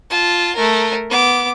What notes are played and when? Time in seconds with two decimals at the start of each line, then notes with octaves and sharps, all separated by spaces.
0.10 F4 A5
0.55 A3 A#4
1.10 B3 D6